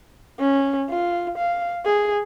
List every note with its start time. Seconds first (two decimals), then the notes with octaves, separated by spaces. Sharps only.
0.39 C#4
0.90 F4
1.38 F5
1.85 G#4